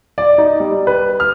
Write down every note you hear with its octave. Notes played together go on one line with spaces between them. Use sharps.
D5
D#4
G3
B4
F6